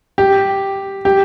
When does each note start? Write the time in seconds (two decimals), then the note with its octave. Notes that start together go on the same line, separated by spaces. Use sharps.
0.18 G4
1.05 G4